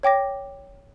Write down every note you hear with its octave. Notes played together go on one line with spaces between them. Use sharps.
C#5 G5 D6 A#6